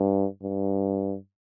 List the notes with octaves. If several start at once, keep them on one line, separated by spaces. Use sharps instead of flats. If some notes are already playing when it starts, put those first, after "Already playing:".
Already playing: G2
G2